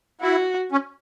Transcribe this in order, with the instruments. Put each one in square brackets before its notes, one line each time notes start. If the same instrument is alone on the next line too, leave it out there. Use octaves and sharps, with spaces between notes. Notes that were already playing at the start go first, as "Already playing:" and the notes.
[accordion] E4 [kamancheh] F#4
[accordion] C#4